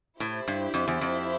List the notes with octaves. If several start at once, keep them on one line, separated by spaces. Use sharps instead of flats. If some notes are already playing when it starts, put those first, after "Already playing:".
A2 E4 G4 C5
G2
F2
E2
F2